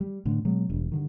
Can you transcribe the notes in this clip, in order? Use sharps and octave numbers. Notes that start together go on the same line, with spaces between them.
G3
A2 D3
B2 F#3 G#3
E1 G2
G2 D3 D#3